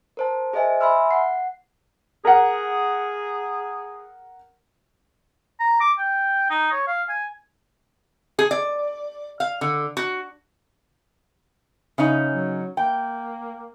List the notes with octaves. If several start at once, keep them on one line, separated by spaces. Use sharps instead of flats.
A#4 C5 A5
G#4 C5 D#5 E5 G#5
E5 G#5 B5 C6 E6 F6
F#5 C7
G#4 A#4 F#5
A#5
D6
G5
D#4
C#5
F5
G#5
G#4
D5
F5
D3
F#4
C#3 C#4 D#4
F#3
A#3 G5